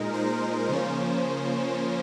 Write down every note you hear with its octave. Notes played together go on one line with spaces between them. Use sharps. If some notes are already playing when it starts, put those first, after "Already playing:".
Already playing: A#2 G#3 D#4 A#4
C5
C#3 F3 A#3 C#4